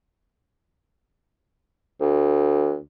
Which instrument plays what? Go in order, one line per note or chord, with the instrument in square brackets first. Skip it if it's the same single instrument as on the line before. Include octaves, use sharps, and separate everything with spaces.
[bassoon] D2